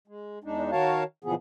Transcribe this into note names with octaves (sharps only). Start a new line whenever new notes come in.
G#3
E2 G#3 D4 D#4
D#3 F#4 A#4 C#5 F5 A5
A#2 C#3 E3 F3 B3 G#4